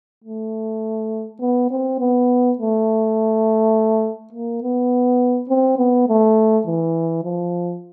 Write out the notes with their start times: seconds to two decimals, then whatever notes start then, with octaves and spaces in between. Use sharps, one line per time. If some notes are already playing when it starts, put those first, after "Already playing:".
0.24 A3
1.41 B3
1.71 C4
2.00 B3
2.58 A3
4.33 A#3
4.62 B3
5.49 C4
5.78 B3
6.08 A3
6.67 E3
7.24 F3